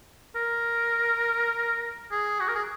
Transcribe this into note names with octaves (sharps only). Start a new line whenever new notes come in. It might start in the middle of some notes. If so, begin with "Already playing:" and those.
A#4
G#4
F#4
A#4
G#4